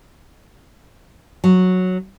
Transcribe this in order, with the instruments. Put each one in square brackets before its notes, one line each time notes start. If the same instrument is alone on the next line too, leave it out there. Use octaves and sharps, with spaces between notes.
[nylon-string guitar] F#3